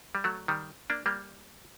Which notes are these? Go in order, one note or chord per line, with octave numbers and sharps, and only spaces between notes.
G3
F#3 A3
D#3 G3
A#3 D4
G3 A#3